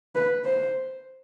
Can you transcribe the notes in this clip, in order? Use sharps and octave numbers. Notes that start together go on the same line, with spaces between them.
B4
C5